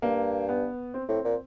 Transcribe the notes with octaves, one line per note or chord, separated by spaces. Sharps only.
G2 A#3
B3
C4
A2 C4
A#2